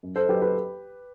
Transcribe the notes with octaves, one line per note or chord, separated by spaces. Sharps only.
F#2
A4 C5
F#3 G4 B4
G4 B4